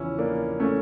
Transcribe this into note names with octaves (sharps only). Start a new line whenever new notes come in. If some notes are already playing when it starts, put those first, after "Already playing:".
Already playing: E2 C#3 F3 C#4 E4
F3 A#3 D4
F3
A3 C#4